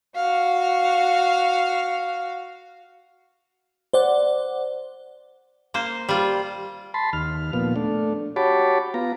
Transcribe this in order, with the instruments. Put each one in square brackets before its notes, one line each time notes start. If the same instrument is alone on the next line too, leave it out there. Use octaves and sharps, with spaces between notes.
[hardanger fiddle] F#4 F5
[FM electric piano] C5 D5 F#5
[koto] A#3 C5
G3 F4
[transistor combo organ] A5 B5 C6
D#2 F6
A#2 F3 B3
A3 D4
F#4 G4 C#5 A5 B5 D6
B3 F4 A#5